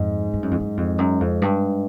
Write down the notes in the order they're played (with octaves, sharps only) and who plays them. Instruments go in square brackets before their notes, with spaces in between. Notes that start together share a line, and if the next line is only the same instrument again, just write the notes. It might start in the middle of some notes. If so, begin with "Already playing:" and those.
Already playing: [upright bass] F2 [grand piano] G#2
[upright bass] G2
F#2
F2
F#2
F2
F#2
F2
G2